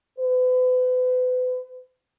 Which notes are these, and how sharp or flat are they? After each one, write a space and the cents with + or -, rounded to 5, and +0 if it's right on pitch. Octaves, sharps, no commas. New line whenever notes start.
B4 +40